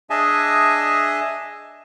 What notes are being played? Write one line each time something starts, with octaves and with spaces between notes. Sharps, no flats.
D4 G#4 D#5 E5 G#5 A5